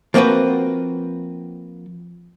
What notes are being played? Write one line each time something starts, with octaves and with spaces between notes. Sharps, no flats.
F3 A#3 C4 F#4 B4